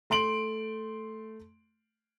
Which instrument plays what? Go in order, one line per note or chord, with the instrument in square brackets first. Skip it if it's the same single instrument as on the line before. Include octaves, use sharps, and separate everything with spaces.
[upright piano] A3 C6 D7 F#7